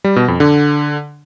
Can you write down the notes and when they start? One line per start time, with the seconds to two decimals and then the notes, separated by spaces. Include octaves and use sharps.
0.04 G3
0.16 B2
0.28 F2
0.40 D3